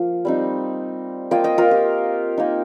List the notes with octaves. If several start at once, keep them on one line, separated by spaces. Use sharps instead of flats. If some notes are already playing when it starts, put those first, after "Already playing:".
Already playing: F3 A#3 F4
G3 C4 D#4
A#3 F4 D#5 G5
D#5 G5
F4 A#4
G4
A#3 D#4